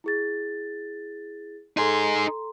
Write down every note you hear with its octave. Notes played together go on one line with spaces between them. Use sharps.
E4 G#4 A6
D#4 G#4 A4 A#5 C6